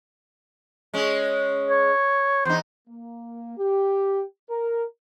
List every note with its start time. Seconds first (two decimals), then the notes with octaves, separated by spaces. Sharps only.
0.94 G#3 C#4
1.70 C#5
2.45 E2 D#4 C5
2.88 A#3
3.58 G4
4.50 A#4